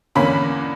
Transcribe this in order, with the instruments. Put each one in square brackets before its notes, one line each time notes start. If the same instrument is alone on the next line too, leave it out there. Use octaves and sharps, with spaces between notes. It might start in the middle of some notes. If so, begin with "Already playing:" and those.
[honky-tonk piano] E2 D3 A#3 C#4 B5